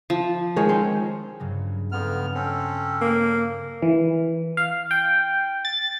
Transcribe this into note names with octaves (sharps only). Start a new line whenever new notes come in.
F3
D#3 G#3 C#5
C4 C#4 C5
G2 C#3 F#3
F2 B3 F6
C4 C#4 A4
E6
A#3 D6
E3
F5
G5
A6